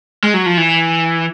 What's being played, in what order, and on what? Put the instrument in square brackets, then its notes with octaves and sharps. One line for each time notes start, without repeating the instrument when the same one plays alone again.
[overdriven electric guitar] G#3
F#3
F3
E3